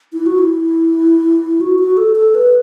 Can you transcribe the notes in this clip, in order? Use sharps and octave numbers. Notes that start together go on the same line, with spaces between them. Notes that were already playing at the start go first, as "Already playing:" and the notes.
E4
F#4
E4
F#4
F#4
A4
A4
B4